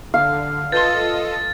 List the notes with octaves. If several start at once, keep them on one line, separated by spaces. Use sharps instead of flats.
D3 F5
F4 A4 B4 D#5 C6 A6